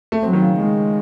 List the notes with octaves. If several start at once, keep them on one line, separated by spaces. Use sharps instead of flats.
A3
F#3 C4
D#3
C#3
D#3 G#3